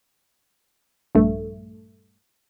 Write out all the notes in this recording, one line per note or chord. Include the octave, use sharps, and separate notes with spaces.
A#1 G2 A3